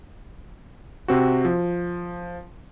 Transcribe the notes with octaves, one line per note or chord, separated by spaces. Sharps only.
C3 C4 F#4
F3